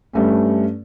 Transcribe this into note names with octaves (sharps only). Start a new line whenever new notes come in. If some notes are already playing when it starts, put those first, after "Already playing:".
G2 A3 C#4